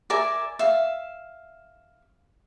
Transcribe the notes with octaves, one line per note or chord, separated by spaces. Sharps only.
A#4 D5 E5 G#5
E5 F5